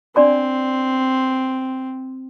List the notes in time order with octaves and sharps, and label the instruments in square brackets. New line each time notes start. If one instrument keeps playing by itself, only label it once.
[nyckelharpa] C4 [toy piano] D4 D5 C6